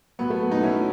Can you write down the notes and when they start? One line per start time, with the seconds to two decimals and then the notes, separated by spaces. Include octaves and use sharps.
0.19 A2 F#3 B3
0.30 A3
0.41 B3
0.51 B3 D#4
0.63 A2 F#3 C#4 E4